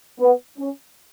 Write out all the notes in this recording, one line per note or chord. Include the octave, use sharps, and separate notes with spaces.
B3
C#4